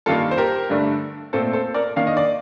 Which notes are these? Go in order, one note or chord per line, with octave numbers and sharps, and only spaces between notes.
G2 D#3 A#3 F4 A4
C5
G4 A#4
G2 D3 A3 D4
A#2 A3 C4 A4 C5
A4 C5
A#4 D5
D#3 A#3 D4 F5
D#5
D5